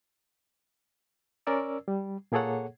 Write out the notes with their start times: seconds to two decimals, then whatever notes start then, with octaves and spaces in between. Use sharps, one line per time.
1.47 C#4 A#4 D5 E6
1.88 G3
2.32 A#2 A#3 G#4 A4 C#5 F#5